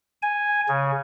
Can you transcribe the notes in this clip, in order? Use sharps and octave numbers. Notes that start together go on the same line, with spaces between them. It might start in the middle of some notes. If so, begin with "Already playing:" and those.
G#5
C#3